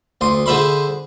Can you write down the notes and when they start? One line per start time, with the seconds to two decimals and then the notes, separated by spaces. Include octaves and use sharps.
0.21 D2 C6 D#6
0.46 D3 G#4 C5 E5 B5 C6